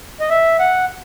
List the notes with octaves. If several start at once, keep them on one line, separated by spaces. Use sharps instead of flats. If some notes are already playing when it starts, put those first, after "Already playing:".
D#5
E5
F#5